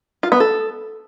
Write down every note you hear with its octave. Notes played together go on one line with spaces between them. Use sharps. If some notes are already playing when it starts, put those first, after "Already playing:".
F4
B3
A4